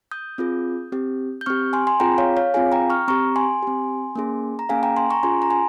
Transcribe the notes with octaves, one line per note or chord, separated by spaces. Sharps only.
D#6 G6
C4 F4 G#4
C4 G4
G6
C4 G4 C#6 F6
G#5 C6
G#5 C6
C4 F4 G#4 G5 A#5
C#5 F5
C#5 F5
C4 F4 G#4 F5 G#5
G5 A#5
C#6 F6
C4 G4 A#5 C#6
G#5 C6
C4 G4
A#3 C#4 G#4
A#5
A#3 C#4 G#4 F5 G#5
G5 A#5
G#5 C6
A#5 C#6
C#4 F4 G#4 G#5 C6
A#5
G#5 C6